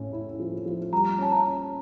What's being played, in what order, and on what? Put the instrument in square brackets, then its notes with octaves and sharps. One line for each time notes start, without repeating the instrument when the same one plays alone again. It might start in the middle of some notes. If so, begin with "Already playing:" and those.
Already playing: [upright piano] A2 C#4
E4
F3
F3
[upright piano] G3 [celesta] A#5
[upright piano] C#4 [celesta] A5
[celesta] A#5
[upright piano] C#4